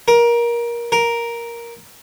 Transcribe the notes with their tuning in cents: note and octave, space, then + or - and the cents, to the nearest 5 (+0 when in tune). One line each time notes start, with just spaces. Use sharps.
A#4 +20
A#4 +5